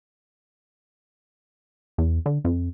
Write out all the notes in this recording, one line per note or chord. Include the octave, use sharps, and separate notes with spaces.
E2
D3
F2